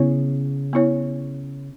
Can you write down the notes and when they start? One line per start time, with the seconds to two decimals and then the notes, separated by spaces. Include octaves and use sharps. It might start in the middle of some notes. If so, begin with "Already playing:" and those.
Already playing: C#3 B3 E4 C#5
0.73 B3 E4 C#5